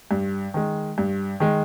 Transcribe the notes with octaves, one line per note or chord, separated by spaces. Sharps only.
G2
D#3 G#3
G2
D#3 G#3